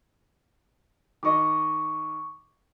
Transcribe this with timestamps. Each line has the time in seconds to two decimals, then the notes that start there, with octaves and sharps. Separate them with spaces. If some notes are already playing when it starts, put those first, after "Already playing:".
1.23 D#3 D#5 C#6 D6